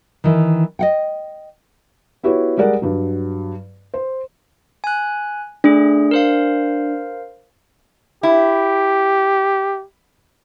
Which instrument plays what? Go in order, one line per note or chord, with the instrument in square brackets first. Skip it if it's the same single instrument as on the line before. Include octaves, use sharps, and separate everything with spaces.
[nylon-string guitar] D#3 E3
D#5 F#5 G5
[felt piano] B3 E4 F#4 G4 B4 C#5
G3 G#3 A#4 D5 F#5
G2 F#3
C5
[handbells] G#5 F#6
[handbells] A3 G#4 [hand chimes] D4
[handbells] A#4 C5 F5
[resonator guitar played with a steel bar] E4 [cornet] G4